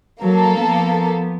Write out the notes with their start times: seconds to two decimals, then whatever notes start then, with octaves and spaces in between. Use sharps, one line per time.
0.21 F#3 A#3 A4
0.58 F3 B3